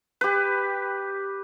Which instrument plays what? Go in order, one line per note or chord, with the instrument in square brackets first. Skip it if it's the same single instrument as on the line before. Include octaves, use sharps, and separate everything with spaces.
[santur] G4 B4